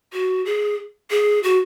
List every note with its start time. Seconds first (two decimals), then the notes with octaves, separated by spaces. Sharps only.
0.13 F#4
0.45 G#4
1.10 G#4
1.43 F#4